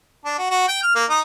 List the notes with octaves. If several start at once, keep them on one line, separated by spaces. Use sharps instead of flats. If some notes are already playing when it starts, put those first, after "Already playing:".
D4
F#4
F#4
G5
F6
A#3
D#4